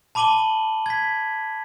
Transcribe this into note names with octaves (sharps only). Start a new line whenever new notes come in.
A5 B5 D6 D#7 F#7 G7
G#6 B6